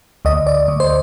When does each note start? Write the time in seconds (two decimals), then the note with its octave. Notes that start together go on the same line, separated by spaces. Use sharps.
0.25 D2 D#5
0.47 D5
0.68 D2
0.80 C5